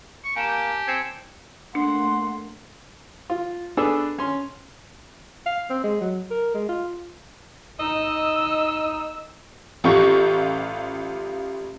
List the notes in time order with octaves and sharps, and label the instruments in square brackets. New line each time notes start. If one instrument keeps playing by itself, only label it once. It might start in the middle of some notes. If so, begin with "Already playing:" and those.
[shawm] C#6
[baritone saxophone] A#3 [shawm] G4 [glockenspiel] G#5 A5 E7
[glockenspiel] G6
[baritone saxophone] C4 [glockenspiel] G#6 C#7 E7
[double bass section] A3 A#3 [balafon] D4 [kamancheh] F#5 [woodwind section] C6
[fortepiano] F4
B3 D4 G#4 A4 E6
C#4 C6
[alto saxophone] F5
C4
G#3
F#3
A#4
G#3
F4
[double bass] D#4 [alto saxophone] D#5 [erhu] E6
[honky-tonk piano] A1 F4 G4 C#6